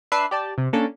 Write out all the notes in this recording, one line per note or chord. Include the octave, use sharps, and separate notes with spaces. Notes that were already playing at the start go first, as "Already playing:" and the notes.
D4 B4 E5 C7
G4 D5 A5
C3
A#3 C#4 D4 A4